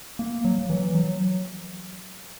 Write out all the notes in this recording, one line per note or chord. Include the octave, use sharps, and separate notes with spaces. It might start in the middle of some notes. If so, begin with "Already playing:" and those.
A#3
F#3
F#3
E3
F#3